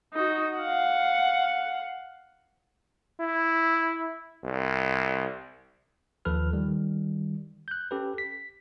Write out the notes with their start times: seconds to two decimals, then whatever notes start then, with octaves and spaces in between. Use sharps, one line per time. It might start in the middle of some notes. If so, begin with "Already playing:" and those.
0.14 D#4 F#4
0.59 F5 F#5
3.20 E4
4.44 C2
6.25 D#2 F3 A4 B4 F6
6.53 D#3 G3
7.68 F#6 G6
7.91 C#4 G4 A4 B4
8.18 B6